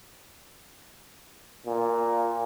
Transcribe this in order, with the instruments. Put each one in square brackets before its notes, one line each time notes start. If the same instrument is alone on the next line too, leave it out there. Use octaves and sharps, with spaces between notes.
[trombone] A#2